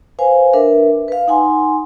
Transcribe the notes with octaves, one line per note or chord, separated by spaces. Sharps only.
B4 C5 F5 G#5
D4 A#4 B4 E5
B4 F5
D#4 F#5 G#5 C6